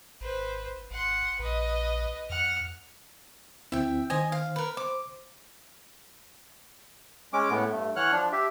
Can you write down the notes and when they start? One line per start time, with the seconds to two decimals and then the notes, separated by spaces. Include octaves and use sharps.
0.21 G#1 B4 C5
0.91 G#1 F#5 C6
1.39 A#1 B4 D#5
2.30 F2 F#5 F6
3.72 D2 C4 E4 E5 G5
4.10 D#3 C5 D#5 G#5
4.32 F5
4.56 A#4 B4
4.77 C5 D6
7.33 G#3 C#4 D6
7.50 A2 B3
7.72 G2 A3
7.96 E3 C#5 F#5 F6 F#6
8.12 F3 D4
8.32 G4 E5